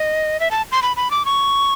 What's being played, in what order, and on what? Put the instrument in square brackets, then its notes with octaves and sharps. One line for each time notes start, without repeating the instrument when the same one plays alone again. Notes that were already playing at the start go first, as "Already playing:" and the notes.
Already playing: [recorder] D#5
E5
A5
C6
B5
B5
D6
C#6